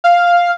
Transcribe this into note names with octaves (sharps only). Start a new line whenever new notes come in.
F5